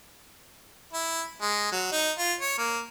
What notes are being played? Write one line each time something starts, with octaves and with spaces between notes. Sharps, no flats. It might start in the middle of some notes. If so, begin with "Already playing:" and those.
E4
G#3
F#3
D#4
F4
C#5
A#3